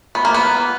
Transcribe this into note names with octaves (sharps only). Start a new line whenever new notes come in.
B3
A#3
B3